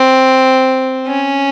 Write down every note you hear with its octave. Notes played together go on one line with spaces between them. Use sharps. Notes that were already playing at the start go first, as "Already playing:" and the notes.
Already playing: C4
C#4